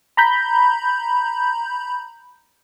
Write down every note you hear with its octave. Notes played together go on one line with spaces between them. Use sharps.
A#5 B5 G6